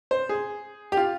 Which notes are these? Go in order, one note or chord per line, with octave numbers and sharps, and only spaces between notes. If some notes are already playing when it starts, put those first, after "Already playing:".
C5
G#4
G4
F4